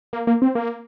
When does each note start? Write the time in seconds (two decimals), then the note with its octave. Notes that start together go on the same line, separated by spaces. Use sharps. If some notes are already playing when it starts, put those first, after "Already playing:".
0.13 A#3
0.27 A#3
0.42 C4
0.55 A#3